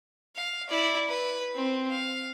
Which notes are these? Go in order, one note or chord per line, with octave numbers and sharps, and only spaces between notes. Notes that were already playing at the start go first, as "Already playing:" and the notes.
F5
E4 D5
B4
C4
F5